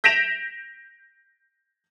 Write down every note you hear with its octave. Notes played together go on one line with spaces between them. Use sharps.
G6 A#6 B6 D7 E7 F7